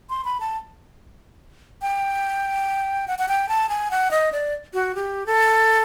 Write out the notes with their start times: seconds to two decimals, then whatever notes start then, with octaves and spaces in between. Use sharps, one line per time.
0.10 C6
0.25 B5
0.40 A5
1.82 G5
3.08 F#5
3.19 F#5
3.28 G5
3.49 A5
3.69 G#5
3.91 F#5
4.11 D#5
4.32 D5
4.74 F#4
4.95 G4
5.26 A4